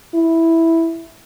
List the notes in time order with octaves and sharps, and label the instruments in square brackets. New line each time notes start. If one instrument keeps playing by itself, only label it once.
[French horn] E4